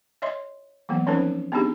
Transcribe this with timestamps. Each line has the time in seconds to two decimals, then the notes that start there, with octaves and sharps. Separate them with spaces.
0.22 C#5 D#5 E5 C6
0.89 E3 F#3 A#3 B3
1.07 F3 C4 C#4 D#4 A#4 C5
1.52 B3 C4 D4 D#4 G4 G#4